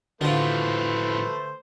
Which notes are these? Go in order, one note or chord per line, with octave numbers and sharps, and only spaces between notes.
A2 D3 F3 A3 F4 F#4 B4 C5